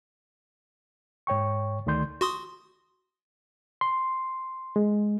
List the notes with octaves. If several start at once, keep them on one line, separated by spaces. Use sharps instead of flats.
G#2 C#5 G5 C#6
D2 D#3 A3 D5 C6 G6
F#4 C6 D#6
C6
G#3